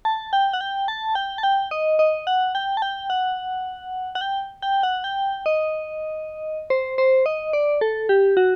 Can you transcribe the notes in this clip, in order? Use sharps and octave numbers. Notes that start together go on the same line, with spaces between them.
A5
G5
F#5
G5
A5
G5
A5
G5
D#5
D#5
F#5
G5
A5
G5
F#5
F#5
G5
G5
F#5
G5
D#5
C5
C5
D#5
D5
A4
G4
F#4